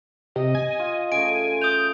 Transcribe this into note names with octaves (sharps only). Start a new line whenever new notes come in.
C3 D#5
G#5
F4
C#3 A3 G#5 D7
D#6 G6 F7